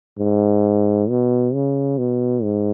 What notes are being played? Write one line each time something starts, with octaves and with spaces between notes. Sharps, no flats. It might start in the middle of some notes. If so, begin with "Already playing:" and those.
G#2
B2
C#3
B2
G#2